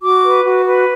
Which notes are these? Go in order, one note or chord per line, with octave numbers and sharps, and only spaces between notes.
F#4 D6
B4
F#4
B4